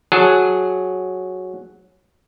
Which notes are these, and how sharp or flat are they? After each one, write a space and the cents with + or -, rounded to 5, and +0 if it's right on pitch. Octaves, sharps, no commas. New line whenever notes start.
F#3 -5 G#4 +0 A5 +0